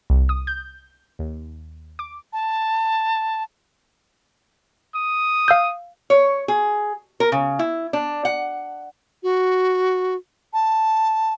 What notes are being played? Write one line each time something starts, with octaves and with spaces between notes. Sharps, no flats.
C2
D#6
G6
D#2
D6
A5
D#6
F5 E6 G6
C#5
G#4
A#4
C#3
E4
D4
F#5
F#4
A5